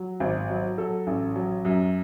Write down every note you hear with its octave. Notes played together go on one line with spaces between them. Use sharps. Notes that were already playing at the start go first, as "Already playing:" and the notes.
Already playing: F#3
G#1
F#3
F#3 A4
A1
F#3
F#2